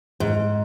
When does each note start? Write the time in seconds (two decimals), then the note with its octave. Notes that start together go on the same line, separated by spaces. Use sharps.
0.20 G#2